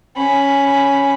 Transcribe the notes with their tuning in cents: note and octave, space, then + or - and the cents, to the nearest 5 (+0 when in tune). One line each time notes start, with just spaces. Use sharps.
C#4 +0 B5 +0